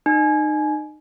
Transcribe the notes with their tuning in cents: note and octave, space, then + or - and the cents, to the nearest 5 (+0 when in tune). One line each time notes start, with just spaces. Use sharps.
D#4 -30 G#5 +30